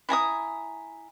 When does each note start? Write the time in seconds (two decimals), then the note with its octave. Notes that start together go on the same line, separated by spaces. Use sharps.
0.09 E4 G#5 A#5 D#6